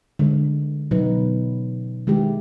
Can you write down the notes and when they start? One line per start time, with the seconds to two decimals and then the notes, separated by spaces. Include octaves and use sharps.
0.19 D3 G#3
0.91 B2 F#3 D#4 B4
2.07 D#3 G#3 E4 G4